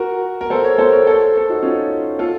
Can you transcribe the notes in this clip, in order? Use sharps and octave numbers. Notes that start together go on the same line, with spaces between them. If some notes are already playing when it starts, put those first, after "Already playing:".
Already playing: F#4 A#4
A#4
A4 C5
A#4 C#5
A4 C5
A#4 C#5
A4 C5
A4
D#4 F#4
C#4 F4
F4 A4